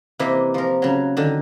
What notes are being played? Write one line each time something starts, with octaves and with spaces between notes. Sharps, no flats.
C3 E3 A#3 G4 D#5 E5
F3 A#4
C#3 F#3
D3 D#3